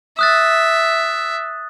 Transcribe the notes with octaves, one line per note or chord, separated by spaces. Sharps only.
E5 D#6 F#6 A6